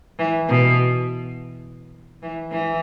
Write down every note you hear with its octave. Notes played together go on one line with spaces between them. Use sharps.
E3
B2
E3
E3